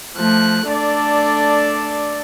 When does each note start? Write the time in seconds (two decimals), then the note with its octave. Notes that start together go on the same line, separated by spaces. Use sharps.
0.16 F3 A3 F#6
0.70 A3 D4 A4 D5